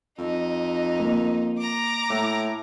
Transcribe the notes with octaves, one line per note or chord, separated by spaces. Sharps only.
F2 D#4
A#3
A#5 D6
A2